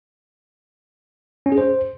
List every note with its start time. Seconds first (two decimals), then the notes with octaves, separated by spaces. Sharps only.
1.46 C#4
1.52 G#4
1.58 C5